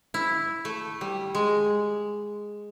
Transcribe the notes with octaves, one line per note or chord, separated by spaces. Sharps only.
E4
A3
G3
G#3